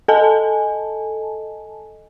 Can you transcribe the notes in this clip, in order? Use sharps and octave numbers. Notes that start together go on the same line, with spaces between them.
A4 D#5 G#5 A5